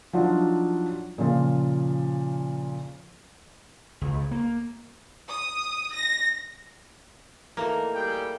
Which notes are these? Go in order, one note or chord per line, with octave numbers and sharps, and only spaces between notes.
F3 F#3 D4 D#4 F4
A#2 C#3 F3 F4
C#2
A#3
D#6
A#6
E3 A3 A#3 D#4
G3 G#4 G5